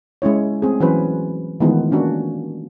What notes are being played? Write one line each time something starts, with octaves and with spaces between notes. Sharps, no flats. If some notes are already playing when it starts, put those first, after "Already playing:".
G#3 C#4 E4 C#5
A3 C4 G#4
E3 F#3 C#4 F#4 B4 C5
D#3 E3 G#3 A3 B3 F4
A#3 C#4 D4 F#4